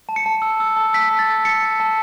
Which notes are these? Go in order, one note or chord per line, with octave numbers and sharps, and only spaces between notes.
A5
C#7
A5
E6
E6
A5
E6 B6
A5
A6
E6
E6 C#7
A5
A5